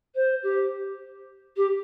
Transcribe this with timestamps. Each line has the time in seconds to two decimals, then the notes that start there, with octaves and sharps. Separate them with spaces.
0.15 C5
0.43 G4
1.57 G4